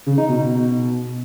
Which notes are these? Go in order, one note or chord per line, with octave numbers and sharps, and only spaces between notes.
C#3
D#4
B2